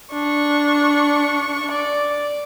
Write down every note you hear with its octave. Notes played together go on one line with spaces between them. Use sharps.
D4 C#6
D5